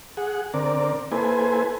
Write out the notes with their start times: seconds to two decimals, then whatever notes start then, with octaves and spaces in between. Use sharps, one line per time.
0.17 G#4 F#5
0.54 D3 C4 A#4 D5
1.11 A#3 E4 A4 B4 C5 G#5